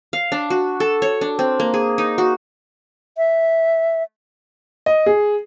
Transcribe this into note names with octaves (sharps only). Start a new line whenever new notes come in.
F5
D4
F#4
A4
C#5
D4
C4
A#3
G#4
D#4
F#4
E5
D#5
G#4